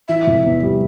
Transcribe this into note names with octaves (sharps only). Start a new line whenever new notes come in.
E3 E5
F1
E2
G3